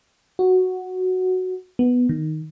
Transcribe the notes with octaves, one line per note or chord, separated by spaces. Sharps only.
F#4
B3
D#3